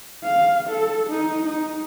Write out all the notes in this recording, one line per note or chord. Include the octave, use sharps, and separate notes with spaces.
F5
A4
D#4
D#4